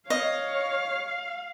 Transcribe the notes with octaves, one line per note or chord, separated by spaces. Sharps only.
C#5 D#5 F5